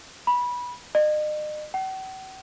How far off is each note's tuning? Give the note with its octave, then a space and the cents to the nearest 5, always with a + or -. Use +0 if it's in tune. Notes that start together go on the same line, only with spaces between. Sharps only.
B5 -15
D#5 -40
F#5 +45